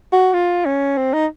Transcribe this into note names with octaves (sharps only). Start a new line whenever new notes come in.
F#4
F4
C#4
C4
D#4